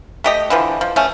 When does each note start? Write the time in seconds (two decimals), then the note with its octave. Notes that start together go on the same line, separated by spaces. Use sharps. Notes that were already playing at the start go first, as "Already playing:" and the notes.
0.24 A3 G4 D#5
0.50 D3 E3 F3
0.81 F3
0.96 F3 A3 C#4